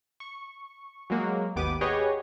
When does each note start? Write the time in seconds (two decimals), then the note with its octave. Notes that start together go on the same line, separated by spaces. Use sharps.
0.20 C#6
1.10 F#3 G#3 A#3 F#4
1.56 G#1 D#2 B3 G4 D6 D#7
1.81 G4 G#4 B4 C#5 D#5 F#5